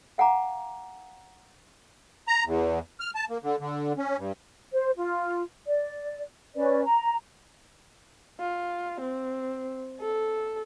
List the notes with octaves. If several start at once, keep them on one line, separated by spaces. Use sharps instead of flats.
F5 F#5 G#5 A#5 D6
A#5
E2
F6
A5
A#3
D3
D3
C#4
G2
C5
F4
D5
C#4 B4 D5
A#5
F4
C4
A4